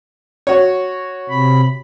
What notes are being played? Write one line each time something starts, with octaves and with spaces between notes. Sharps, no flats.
F#4 C#5
C3 B5